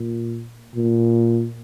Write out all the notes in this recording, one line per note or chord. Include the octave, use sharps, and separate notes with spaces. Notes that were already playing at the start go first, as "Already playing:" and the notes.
Already playing: A#2
A#2